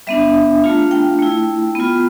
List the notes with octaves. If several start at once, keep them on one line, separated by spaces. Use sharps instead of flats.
G3 B3 D4 E5
A3 D4 F4 F5
G5
A3 E4
B3 F4